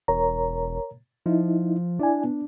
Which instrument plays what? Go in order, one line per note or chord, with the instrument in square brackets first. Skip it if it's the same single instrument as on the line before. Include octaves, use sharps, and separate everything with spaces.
[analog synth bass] E1 [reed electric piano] A#4 C#5 A#5
[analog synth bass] F3 [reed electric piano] D#4 E4
[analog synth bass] D4 [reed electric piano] E4 D5 G#5
[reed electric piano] B3